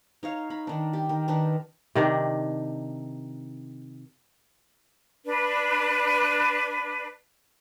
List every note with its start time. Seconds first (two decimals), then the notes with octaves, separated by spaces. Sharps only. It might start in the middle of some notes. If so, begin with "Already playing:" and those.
0.23 D#4 C#5 F5
0.50 D#4 B5
0.67 D#3 D4
0.93 G4
1.09 D#3
1.28 D#3 D4 D#4 B4
1.95 C3 D#3 D4
5.25 D4 B4